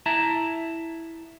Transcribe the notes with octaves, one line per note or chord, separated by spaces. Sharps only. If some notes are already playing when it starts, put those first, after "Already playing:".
E4 E5 A5 A#5